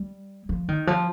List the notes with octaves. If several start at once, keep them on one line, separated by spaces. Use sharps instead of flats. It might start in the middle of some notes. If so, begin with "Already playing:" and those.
Already playing: G3
F3
D#3
F3